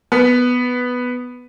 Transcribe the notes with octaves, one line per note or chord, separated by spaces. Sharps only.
B3